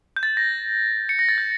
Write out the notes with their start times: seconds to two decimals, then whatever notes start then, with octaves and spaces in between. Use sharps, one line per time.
0.16 G6
0.23 A6
0.37 A#6
1.09 C#7
1.19 A#6
1.29 A6
1.38 G6